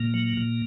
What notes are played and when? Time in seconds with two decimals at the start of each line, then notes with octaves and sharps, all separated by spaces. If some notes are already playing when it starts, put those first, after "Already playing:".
Already playing: A#2 A#3
0.14 F#3
0.37 A#2